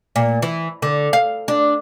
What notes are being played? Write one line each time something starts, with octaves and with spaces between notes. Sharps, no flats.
A#2
E3
D3
F5
D4